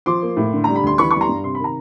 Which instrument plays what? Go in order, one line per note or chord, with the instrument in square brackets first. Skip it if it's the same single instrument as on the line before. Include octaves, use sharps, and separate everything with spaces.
[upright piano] F3 C6 D6
A#3
A2
D3
G3 A#5
B5
D2 C6
E3 B5 C#6
G3 C#6
A#5 C6
G2
C3 C6
B5
D#3 A#5